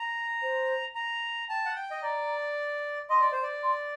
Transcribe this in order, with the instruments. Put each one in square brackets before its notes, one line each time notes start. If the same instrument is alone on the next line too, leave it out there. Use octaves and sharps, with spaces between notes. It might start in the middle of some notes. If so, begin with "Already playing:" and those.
Already playing: [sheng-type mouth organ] A#5
[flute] C5
[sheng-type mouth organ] A#5
[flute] G5 [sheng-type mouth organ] A5
[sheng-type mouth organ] F#5
G5
D#5
[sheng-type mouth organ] D5 [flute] A#5
[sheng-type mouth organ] D#5 [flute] C6
[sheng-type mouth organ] D5
C5
D5
[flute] C6